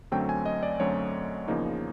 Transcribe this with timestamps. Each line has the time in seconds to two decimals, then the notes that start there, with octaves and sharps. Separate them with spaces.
0.12 F#2 D3 F#3 A3 C4 G5
0.29 G#5
0.46 D#5
0.63 D5
0.80 F#2 D3 F#3 A3 C4 C#5
1.48 E2 C#3 F3 A#3 D#4